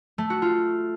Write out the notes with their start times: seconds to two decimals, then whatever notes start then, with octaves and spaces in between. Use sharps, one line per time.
0.18 A3
0.30 F#4
0.42 F4